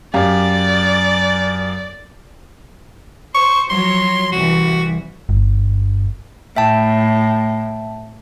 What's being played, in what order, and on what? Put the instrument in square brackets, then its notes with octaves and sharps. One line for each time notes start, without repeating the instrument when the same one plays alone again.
[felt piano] F#2 G4 F5 [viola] D5
[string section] C5 [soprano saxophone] C#6
[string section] F3 F#3 C#5 [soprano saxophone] C6
[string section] C2 E3 [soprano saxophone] F#4
[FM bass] G1 [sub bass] G2
[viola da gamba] A2 [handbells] E5 G5 A5